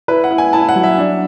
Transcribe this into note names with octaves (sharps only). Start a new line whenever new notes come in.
E4 B4
F#5
E4
G#5
E4 A5
F#5
F#3
E5
D4